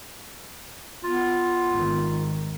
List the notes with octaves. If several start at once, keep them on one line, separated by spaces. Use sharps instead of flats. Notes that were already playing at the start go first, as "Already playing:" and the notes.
B3 F4
G#1 D#3